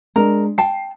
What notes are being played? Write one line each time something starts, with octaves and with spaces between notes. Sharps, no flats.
G#3 D4 A#4
G5 A5 C7